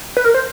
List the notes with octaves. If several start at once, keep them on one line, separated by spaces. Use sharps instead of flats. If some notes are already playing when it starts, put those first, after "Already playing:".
B4
A#4
C5